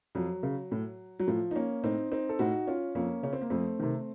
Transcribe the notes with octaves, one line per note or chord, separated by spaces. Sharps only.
F2 F#3
C#3
A2
F#3
A2 F3
D#4
A#3 C#4
A2 C4 D#4
C4 D#4
A4
A2 D#4 F#4
C#4 F4
F2 A#3 C#4
C#3 C#4
C4
A#3
F2 A3 C4
C3 D#3